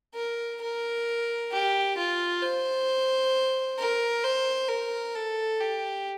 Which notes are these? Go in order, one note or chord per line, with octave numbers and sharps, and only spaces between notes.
A#4
A#4
G4
F4
C5
A#4
C5
A#4
A4
G4